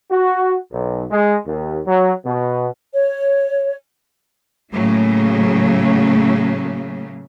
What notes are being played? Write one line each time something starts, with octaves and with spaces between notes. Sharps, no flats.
F#4
B1
G#3
D#2
F#3
B2
C#5
A2 C#3 F#3 A3 A#3